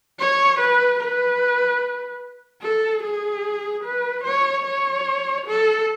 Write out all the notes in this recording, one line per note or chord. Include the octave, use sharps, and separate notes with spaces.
C#5
B4
B4
A4
G#4
B4
C#5
C#5
A4